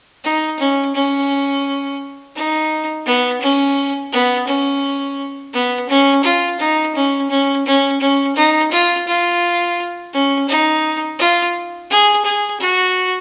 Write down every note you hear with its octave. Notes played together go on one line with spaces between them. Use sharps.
D#4
C#4
C#4
D#4
B3
C#4
B3
C#4
B3
C#4
F4
D#4
C#4
C#4
C#4
C#4
D#4
F4
F4
C#4
D#4
F4
G#4
G#4
F#4